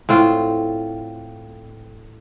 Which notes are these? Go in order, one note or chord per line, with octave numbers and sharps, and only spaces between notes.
A2 C4 F4